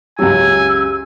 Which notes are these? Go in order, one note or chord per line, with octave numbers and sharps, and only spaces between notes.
C#2 F#2 F#3 G4 G#5 E6